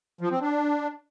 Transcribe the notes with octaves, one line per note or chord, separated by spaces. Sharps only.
F3
C4
D4